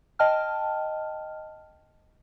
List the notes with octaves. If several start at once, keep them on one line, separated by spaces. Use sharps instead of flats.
D#5 G5 A5 F6